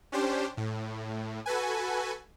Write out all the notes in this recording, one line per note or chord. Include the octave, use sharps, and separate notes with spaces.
C#4 D4 G4 C5
A2
F#4 A4 B4 G#5